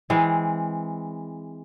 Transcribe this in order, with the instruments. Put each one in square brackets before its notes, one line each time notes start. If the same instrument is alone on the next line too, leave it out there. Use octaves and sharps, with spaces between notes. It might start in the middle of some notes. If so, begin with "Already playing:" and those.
[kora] E3 G#3 C4